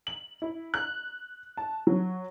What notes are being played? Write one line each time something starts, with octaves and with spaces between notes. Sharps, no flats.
F#7
E4
F#6
A5
F#3